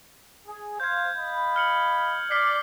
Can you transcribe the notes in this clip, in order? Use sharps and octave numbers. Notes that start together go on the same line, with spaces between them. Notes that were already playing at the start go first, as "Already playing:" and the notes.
G#4
C5 F5 G6 G#6
D#5 F5 B5
F6 C#7 F#7
D5 F6 B6 C7